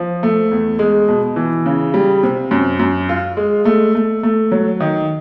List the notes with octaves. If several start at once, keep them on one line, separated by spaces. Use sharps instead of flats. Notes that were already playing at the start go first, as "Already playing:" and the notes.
Already playing: F3
A3
E2
G#3
B2
E3
C#3
G3
C3
F#2
F#2
F4
G#3
A3
A3
A3
F#3
D#3